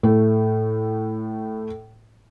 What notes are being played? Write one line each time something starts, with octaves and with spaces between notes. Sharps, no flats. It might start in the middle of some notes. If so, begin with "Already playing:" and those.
A2 A3